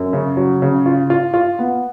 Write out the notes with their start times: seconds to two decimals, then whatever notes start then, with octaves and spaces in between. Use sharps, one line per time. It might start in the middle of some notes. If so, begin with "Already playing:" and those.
Already playing: F#2
0.13 C#3
0.37 F#3
0.62 C#3
0.86 F4
1.10 F4
1.34 F4
1.59 B3